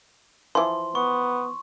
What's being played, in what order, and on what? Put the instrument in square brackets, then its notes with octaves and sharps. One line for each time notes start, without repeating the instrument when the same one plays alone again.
[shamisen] E3 F3 [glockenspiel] C6
[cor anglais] B3 [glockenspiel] C#6